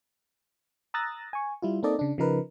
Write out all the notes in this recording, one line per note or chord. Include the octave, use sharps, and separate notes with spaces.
A#5 D#6 E6 F#6 A6 A#6
G#5 C#6
G3 E4 F4
A#3 C4 D#4 A4 D5 D#5
C#3 D4
C#3 F3 D#4 A#4 B4